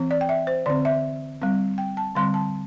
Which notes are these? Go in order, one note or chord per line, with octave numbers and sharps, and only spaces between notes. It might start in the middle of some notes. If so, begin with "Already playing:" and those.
Already playing: E3 C4
D5
G5
E5
C5
D3 C4 D5
E5
G3 C4
G5
A5
D3 G3 C4 C6
A5